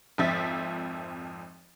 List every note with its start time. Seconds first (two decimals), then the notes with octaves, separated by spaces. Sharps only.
0.18 G#1 F2 F3 E5 A6 B6